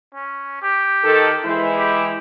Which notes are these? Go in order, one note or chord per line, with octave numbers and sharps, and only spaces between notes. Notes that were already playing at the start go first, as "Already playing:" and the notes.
C#4
G4
D#3 A4
E3 G#3 E4 C5
G4